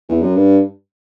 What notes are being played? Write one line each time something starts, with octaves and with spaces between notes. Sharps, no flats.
E2
F#2
G2